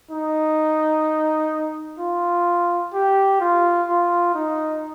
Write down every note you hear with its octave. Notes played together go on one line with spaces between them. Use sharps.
D#4
F4
G4
F4
F4
D#4